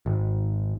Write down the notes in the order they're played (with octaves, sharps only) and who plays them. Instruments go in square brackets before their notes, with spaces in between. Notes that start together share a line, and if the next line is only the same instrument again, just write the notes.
[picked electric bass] G#1